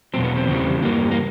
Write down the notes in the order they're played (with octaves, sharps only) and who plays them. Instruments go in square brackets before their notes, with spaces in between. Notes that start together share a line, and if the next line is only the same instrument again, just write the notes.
[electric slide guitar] E2 B2 F#3 C4
B3
C4
E2 C#3 E3 G3
G2 E3 G3 A#3
A#3